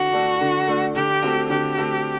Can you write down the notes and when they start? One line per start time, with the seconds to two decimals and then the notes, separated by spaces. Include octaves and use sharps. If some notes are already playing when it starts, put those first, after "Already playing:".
Already playing: D3 F#4
0.13 A3 D4
0.41 D3
0.68 A3 D4
0.96 D3 G4
1.22 A3 C4 F#4
1.50 D3 G4
1.78 A3 C4 F#4